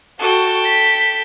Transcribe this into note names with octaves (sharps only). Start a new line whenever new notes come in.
F#4 A4 G5
B6